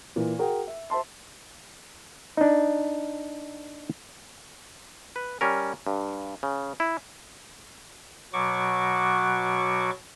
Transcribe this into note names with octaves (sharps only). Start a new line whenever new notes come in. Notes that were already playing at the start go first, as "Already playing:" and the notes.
A#2 E3
F#4 G#4 A#4 F#5 G5
E5
C5 E5 A5 C6
D4 D#4
B4
G3 C#4 A#4
G2
C#3
E4
B2 F#3 F#4 C#6 D6